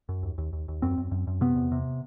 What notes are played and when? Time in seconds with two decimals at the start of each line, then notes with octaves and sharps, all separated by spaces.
0.09 F#2
0.23 D#2
0.38 D#2
0.53 D#2
0.68 D#2
0.82 F#2 C4
0.98 F#2
1.11 F#2
1.27 F#2
1.41 C3 B3
1.56 E2
1.72 C3